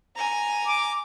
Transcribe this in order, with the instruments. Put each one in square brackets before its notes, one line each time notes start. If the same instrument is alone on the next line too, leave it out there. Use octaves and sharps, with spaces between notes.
[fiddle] G#5 A#5
[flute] D6